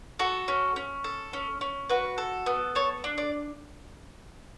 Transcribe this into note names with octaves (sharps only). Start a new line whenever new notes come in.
F#4 A4
C#4
C#4
A4
C#4
C#4
F#4 B4
A4
B3
A4 C#5
D4
D5